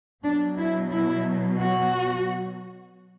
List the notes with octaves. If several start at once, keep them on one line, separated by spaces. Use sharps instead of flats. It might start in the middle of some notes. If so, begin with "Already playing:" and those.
B2 F#3 D4
E4
E4
F#4